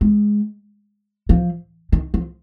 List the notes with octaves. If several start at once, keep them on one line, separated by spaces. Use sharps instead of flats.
G#3
F3
D#3
F3